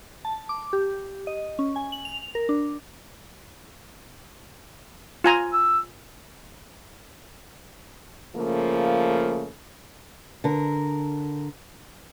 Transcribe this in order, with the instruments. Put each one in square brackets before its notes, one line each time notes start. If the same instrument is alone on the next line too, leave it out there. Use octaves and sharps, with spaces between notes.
[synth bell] A5
D6
G4
D#5
C#4
G#5
F#7
F7
A#4
D4
[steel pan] F4 G#5 A#5
[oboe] E6
[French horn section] C#3 F3 A3 A#3
[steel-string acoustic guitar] D3 A#4